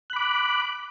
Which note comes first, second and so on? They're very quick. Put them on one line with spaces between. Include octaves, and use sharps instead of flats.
F#6 B5 D6